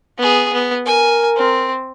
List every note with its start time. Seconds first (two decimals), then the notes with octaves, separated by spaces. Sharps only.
0.19 B3 G#4
0.53 B3
0.86 A#4 G#5
1.37 C4